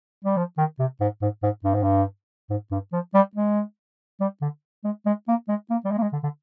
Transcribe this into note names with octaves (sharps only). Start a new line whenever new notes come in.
G3
F3
D#3
C3
G#2
G#2
G#2
G2
G#2
G2
G#2
G2
F3
G3
G#3
G3
D3
G#3
G#3
A#3
G#3
A#3
G3
G#3
A#3
G#3
D3
D3